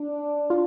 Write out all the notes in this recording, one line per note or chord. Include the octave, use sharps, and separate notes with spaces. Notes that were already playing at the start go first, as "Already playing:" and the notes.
Already playing: D4
F4